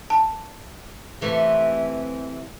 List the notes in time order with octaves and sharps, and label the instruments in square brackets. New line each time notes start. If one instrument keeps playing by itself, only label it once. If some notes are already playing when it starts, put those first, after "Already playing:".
[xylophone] A5
[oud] C3 E3 A3